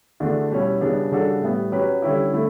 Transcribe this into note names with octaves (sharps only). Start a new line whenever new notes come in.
E2 D3 A3 D4 F#4
B2 G3 C#4 E4
F#2 C#3 G3 B3 D4
C#3 G3 D4 F#4 A4
A2 G3 B3
F#3 C#4 G4 B4
D3 G3 C#4 E4 G4
D3 A3 E4